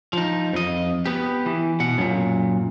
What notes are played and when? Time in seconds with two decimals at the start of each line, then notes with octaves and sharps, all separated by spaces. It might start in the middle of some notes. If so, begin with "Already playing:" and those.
0.13 F3 D#4
0.53 F2 D#5
1.05 B3 G4
1.46 E3
1.80 B2 F#5
1.98 F#2 A#2